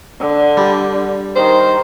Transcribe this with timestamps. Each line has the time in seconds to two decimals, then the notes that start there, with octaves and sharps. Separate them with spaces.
0.20 D3
0.57 G3
1.36 D#3 C5